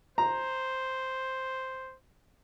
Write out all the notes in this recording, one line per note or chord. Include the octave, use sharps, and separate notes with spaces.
C5 A#5